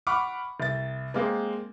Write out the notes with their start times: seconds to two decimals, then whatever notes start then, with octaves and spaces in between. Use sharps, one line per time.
0.07 F#5 B5 C#6 D6 F6
0.60 C2 A6
1.14 G#3 A#3 C4